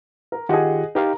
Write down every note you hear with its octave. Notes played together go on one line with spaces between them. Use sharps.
A#4
D#3 F4 G4 G#4 D#5 F#5
D#4 G4 A#4 F5